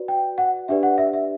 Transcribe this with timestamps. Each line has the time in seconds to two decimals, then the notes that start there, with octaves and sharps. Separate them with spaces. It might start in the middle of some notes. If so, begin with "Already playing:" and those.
Already playing: F#4 B4 D5
0.08 G5
0.38 F#5
0.68 D4 G4 B4 D5 E5
0.83 F#5
0.98 E5
1.13 E5